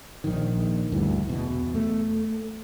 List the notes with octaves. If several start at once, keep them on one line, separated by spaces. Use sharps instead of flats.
A#1 D#3
D2 G2 E3
E2 B2
A3